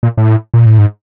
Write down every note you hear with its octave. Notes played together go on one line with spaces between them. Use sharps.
A#2
A2
A#2
A2
G#2